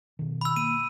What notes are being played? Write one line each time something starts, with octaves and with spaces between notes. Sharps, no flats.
B2 D#3
B5 E6
A#3 D#7